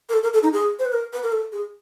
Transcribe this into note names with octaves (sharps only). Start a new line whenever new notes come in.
A#4
A4
A#4
A4
D#4
G#4
C5
B4
A#4
B4
A#4
A4
G#4